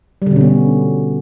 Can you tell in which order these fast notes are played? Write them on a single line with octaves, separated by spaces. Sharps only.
G3 D3 B2 C#4 B3